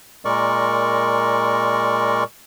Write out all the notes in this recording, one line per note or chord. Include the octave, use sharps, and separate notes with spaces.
A#2 G#3 A#4 D5 C#6